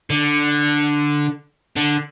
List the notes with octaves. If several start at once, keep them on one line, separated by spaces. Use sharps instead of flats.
D3
D3